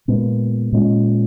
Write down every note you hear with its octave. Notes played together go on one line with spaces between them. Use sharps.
A#2 G#3 B3
A#2 G#3 C#4